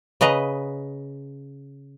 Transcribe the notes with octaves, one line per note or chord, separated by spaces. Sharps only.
C#3 B4 D#5 A#5